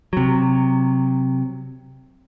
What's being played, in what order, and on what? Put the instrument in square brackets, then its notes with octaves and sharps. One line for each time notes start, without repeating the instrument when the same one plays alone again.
[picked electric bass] C3 F#3